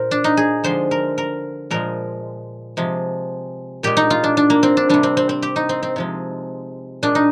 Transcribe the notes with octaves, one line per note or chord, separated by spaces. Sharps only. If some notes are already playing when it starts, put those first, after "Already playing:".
Already playing: A#2 A#4 C5
D4
D#4
G#4
D3 F3 G#3 C5
A#4
A#4
A#2 F3 G#3 A#4
C3 F3 G#3
A#2 G#3 G4
D#4
F4
D4
D4
A#3
C4
D4
C3 G3 D4
C4
C4
C4
G4
D#4
C4
C4
C3 F3 G#3
A#2 G#3 D4
D#4